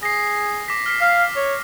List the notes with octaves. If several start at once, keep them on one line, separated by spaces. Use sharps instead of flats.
G#4 A#6 C7
D6 A#6 B6
F6 B6 C7
F5
C#5